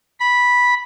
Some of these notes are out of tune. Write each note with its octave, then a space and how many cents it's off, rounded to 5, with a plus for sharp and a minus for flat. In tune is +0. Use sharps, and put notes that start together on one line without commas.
B5 -10